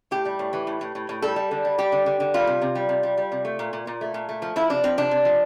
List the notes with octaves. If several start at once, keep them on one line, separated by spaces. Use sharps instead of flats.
A2 G4
G3
A2
E3
A2
A2
A2
A2
G3 A4
G3
D3
G3
G3 G4
D3
D3
D3
G3 F4
C3
C3
G3
C3
G3
G3
C3
A3
A#2
A#2
A#2
A3
A#2
A3
F3
F3 E4
C3 D4
F3 C4
C3 D4
C3
F3